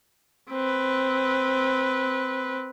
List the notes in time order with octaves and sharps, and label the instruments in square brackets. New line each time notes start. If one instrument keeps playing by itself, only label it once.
[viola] C4 B4